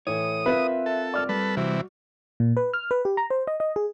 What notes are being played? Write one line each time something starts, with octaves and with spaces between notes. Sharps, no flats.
A2 E3 C#5 D#6
C4 F4 A#4 B4 E5
A4
D5 F6
G3 A4 B4
C3 E3 F#4
A#2
B4
F6
B4
G4
A#5
C5
D#5
D#5
G#4